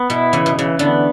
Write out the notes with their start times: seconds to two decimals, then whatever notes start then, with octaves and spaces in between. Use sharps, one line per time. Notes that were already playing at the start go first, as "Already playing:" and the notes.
Already playing: B3
0.10 B2 E4
0.33 C#3 E3
0.46 B2
0.56 C#3 E3
0.79 D3 B3